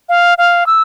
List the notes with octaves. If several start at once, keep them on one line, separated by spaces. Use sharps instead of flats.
F5
F5
E6